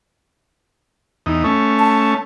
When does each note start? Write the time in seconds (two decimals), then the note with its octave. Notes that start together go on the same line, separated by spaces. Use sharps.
1.26 E2 D#4
1.44 A3 C#4
1.79 A5